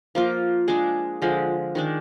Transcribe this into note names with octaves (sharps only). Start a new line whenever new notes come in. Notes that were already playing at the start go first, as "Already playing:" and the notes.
F3 A#3 F4
G#3 D4 G#4
D3 F3 G#3
D#3 G#3 D4